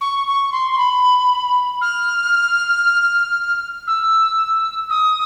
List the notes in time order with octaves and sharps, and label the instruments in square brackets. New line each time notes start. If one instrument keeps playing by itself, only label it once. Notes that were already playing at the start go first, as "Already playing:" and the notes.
[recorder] C#6
C#6
C6
C6
B5
F6
E6
D#6